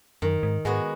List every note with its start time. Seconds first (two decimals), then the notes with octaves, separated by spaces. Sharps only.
0.22 F#2 D#3
0.43 G#2
0.65 G#2 G#3 B3 F#4